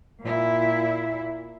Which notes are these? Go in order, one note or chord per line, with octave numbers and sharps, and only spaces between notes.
A#2 E4